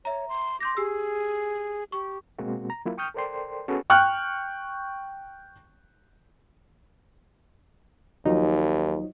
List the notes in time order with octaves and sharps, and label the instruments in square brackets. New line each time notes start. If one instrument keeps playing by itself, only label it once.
[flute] C#5 [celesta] E5 A#5
[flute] C6
[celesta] C6 G6 A#6 [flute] D6
[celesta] G4 E6 [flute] G#4
[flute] G4 [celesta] C#6
[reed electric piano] B2 G#3 A#3 C4 F#4
A#5
F#3 A#3 E4 F4 A#4
G5 C#6 D#6 F6 G6
A4 A#4 C5 D5 G5 C6
B3 C#4 F#4 G#4 A4 B4
[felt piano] G5 C#6 F6 F#6
[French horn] D#2 [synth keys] F3 F#3 D#4